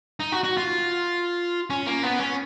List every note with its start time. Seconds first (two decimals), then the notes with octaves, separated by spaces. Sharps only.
0.20 D#4
0.32 F#4
0.44 F#4
0.57 F4
1.70 C#4
1.87 A#3
2.03 B3
2.20 C#4